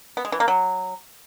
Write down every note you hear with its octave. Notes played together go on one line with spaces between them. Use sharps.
B3
G#3
E3
A#3
F#3